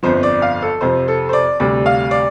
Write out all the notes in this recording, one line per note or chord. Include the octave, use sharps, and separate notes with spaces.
G1 F2 F3 C5
D5
F5
A4
F2 C3 F3 C5
A4
C5
D5
D2 C3 G3 D5
F5
D5